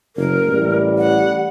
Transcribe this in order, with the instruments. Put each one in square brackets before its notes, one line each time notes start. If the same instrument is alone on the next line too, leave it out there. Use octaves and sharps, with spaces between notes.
[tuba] F#1 [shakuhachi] A#4
[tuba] A1 [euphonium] G3
[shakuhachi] F#5